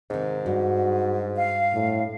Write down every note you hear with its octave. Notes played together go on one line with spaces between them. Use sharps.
G#2 C3 D#3
G2 F#4
F5
A2